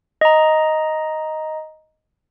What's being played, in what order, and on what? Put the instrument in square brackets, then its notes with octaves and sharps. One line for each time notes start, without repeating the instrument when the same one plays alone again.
[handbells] D#5 A#5